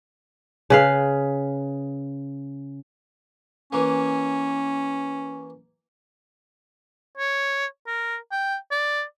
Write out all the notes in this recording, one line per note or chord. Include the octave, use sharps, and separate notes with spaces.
C#3 B4 F5
E3 A#3 C#4
C#5
A#4
G5
D5